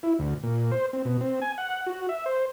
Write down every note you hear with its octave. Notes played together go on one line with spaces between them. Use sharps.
E4
D2
A#2
C5
C4
B2
C4
G#5
F#5
F#4
E5
C5